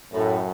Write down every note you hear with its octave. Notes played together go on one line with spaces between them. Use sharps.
F#2 A2